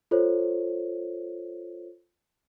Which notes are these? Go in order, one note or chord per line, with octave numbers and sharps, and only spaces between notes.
F4 A4 C5 C#5